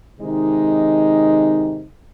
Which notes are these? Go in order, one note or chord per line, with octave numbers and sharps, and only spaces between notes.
C3 D#3 G#3 D#4